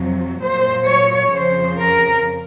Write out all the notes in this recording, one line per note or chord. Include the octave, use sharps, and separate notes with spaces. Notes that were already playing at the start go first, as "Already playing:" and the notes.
Already playing: F2 C3 F#3
A#2 F#3 C5
C#5
F2 C#3 F3 C5
A#4